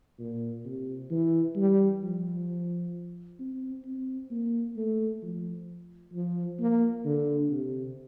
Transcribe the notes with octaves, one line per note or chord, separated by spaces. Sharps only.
A#2
C3
E3
G3
F3
C4
C4
A#3
A3
F3
F3
A#3
D3
C3